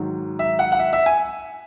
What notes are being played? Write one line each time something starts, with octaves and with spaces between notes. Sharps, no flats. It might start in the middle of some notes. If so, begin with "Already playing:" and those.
Already playing: G#2 D#3 F#3
E5
F#5
F#5
E5
E5
G#5